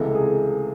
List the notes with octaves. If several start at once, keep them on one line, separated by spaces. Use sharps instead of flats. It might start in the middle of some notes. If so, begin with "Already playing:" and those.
Already playing: C#2 C3 E3 A3 A4
G#4